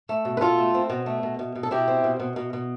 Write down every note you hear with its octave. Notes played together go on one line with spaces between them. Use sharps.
A3
B2
B4
B2 F4 A4
A3
C4
B2
A3
B2
B2
B2
A4
B2 E4 G4
C4
B2
B2
B2
B2